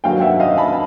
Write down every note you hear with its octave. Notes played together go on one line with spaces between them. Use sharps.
G2 D#3 F#3 F5 G5
E5 F#5
D#5 F5
A5 B5